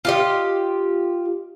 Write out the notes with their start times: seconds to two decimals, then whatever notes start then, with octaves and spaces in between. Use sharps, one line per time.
0.05 F4 G4 D#5